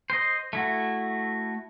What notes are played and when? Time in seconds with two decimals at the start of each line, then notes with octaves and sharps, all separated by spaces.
0.10 C5 D#5
0.53 A3 E4 F#4